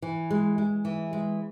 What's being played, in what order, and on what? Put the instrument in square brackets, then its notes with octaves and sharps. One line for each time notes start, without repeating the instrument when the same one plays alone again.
[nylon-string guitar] E3
G#3
G#3
E3
G#3